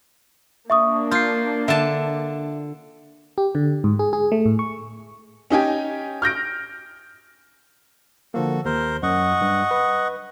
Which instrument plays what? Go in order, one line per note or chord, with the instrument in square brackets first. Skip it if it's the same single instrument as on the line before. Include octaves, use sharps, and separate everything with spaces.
[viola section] A#3 D4 [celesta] E5 C#6 D#6
[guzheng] F4 [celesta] G6 C7
[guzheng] D3 A5 [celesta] E5
[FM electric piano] G4
D3
G#2
G#4
G#4
A3
A2
C#6
[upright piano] C#4 D#4 G4 G#5
F6 G6 A#6 D7
[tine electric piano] D3 F3 A#3 [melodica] F#4 A4
[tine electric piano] D#2 [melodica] A#4 C5
[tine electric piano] F#2 [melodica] D#5 F#5 C#6
[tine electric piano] G2
B4